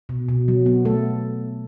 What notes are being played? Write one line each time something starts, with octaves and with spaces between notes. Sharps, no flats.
B2
B2
F#3
B3
A3 A4